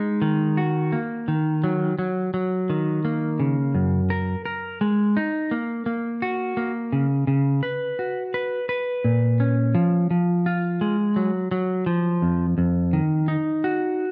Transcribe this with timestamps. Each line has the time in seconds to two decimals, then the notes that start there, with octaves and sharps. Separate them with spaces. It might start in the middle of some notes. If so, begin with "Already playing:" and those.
Already playing: G#3 D#4
0.22 D#3
0.57 F#4
0.92 A#3
1.28 D#3
1.64 F#3
1.99 F#3
2.34 F#3
2.70 D#3
3.05 A#3
3.40 C#3
3.75 F#2
4.10 A#4
4.45 A#4
4.81 G#3
5.17 D#4
5.51 A#3
5.86 A#3
6.22 F#4
6.57 A#3
6.92 C#3
7.27 C#3
7.63 B4
7.99 F#4
8.34 B4
8.69 B4
9.04 A#2
9.40 C#4
9.75 F3
10.11 F3
10.46 F4
10.81 G#3
11.16 F#3
11.51 F#3
11.86 F3
12.22 F2
12.58 F2
12.93 D#3
13.28 D#4
13.64 F#4